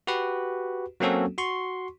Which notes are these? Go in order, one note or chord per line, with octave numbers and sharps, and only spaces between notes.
F#4 G4 B4
F#3 A#3 C4 C#4 F#4 A4
F#4 C6 C#6